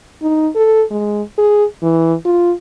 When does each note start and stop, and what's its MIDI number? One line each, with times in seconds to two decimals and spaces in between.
0.22 0.48 63
0.55 0.83 69
0.91 1.22 56
1.38 1.65 68
1.82 2.14 52
2.25 2.53 65